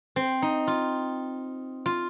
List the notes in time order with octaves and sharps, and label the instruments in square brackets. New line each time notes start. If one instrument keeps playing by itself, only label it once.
[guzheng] C4
D#4
F4
F4